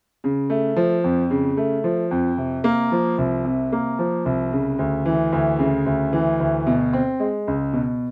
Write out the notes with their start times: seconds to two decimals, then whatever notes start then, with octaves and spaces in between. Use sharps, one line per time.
0.24 C#3
0.50 A3
0.76 F3
1.04 F2
1.30 C#3
1.57 A3
1.84 F3
2.11 F2
2.38 C3
2.64 A#3
2.92 F3
3.18 C2
3.45 C3
3.72 A#3
3.99 F3
4.26 C2
4.52 C#3
4.79 D2
5.06 E3
5.32 D2
5.59 C#3
5.86 D2
6.13 E3
6.39 D2
6.67 B2
6.93 C4
7.20 G#3
7.47 C#2
7.73 B2